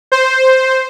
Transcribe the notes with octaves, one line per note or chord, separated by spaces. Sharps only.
C5